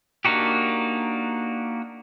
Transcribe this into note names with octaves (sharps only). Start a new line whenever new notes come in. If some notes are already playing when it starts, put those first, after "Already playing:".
A#3 D4 D#4 F#4 G4